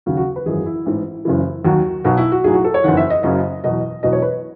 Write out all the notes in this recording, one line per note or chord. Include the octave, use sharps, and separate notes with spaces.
D#2 C#3 F#3 F#4
F#4
B4
G#1 F#2 E3 G#4
E4
A1 G#2 E3
F#1 F#2 C#3 E3
D#2 D#3 F#3 F#4
B1 B2 F#3 F#4
E4
F#4
B1 A2 F#3 G#4
F#4
A4
C#5
F#1 E2 D#3 F#5
E5
D#5
F#1 F#2 C#3 F#3 D#5
E2 B2 F#3 D#5
E1 E2 B2 F#3 D#5
C#5
B4